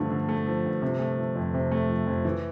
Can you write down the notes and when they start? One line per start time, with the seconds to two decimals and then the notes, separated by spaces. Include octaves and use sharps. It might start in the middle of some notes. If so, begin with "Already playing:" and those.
Already playing: G2 D3 F3 A3
0.10 D3
0.29 A3
0.46 F3
0.65 G2
0.82 C3
0.99 A3
1.17 F3
1.36 F2
1.54 C3
1.72 A3
1.89 F3
2.07 F2
2.25 E3